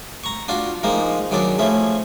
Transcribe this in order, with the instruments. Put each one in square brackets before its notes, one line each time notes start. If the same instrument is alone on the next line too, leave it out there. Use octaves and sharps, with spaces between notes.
[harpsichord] A#5 C#6
D4 F4 F#4
F3 G#3 A#3 D#4
D#3 F#3 G#3 D4 D5
F3 A3 C#4 E4